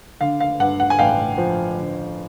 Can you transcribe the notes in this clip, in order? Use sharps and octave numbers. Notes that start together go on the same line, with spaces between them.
D3 F5
F5
G2 F#5
F#5
G#5
A1 F5 G5
F3
D3